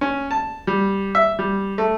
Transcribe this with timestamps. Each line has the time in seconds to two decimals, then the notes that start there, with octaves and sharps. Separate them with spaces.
0.01 C#4
0.31 A5
0.67 G3
1.15 E5
1.39 G3
1.78 A3